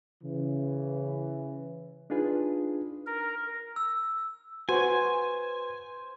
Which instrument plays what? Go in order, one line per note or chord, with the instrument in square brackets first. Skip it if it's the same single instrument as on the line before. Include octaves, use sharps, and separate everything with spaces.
[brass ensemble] C#3 E3
[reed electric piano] D4 D#4 F4 G#4 B4
[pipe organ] A#4
[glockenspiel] E6
[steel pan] F#4 [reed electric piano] B4 [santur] C5 [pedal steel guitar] G#5